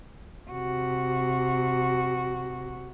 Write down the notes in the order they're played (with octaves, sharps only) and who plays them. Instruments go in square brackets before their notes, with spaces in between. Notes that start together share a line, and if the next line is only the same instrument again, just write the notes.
[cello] C3 F#4